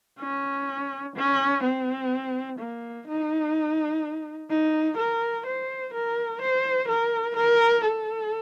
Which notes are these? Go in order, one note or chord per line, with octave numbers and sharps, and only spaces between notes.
C#4
C#4
C4
A#3
D#4
D#4
A#4
C5
A#4
C5
A#4
A#4
A4